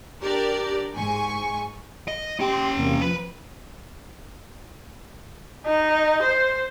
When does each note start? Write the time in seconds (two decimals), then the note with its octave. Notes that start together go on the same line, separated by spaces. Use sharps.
0.22 D4 G4 A#4 D5
0.95 G#2 G#5 C#6
2.08 D#5
2.40 C#4 G4 G5 C6
2.76 E2 C3 A#3
3.01 F3 B4
5.66 D#4
6.22 C5